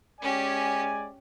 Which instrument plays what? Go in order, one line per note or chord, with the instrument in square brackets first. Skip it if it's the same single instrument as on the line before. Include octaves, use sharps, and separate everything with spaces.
[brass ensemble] G#3 D5 G#5 [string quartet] C#4 G4